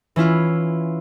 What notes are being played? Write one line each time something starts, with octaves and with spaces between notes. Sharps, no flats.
E3 C#4 E4 F4